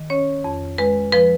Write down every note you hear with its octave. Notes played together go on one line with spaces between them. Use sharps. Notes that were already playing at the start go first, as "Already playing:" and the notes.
Already playing: D#3
C#4 C#5
F2
G#3 B4
F3 B4